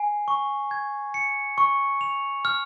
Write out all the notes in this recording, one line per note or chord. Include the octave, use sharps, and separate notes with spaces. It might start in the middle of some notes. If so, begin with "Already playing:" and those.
Already playing: G#5 C7
C#6
G#6
C#7
C#6
F7
F6